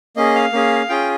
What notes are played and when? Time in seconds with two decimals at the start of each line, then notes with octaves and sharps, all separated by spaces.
0.17 A#3 C#4 G#4 D#5
0.35 F5
0.53 A#3 C#4 G#4
0.89 C#4 F4 G#4 G5